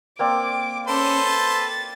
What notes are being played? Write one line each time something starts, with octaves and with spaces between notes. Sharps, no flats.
A#3 C4 D5 D6
C#4 A4 B4 C5
A6